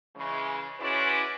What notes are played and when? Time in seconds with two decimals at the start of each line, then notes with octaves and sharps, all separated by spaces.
0.16 C#3 E3 G#3
0.80 G#3 C#4 E4 F#4 B4 D5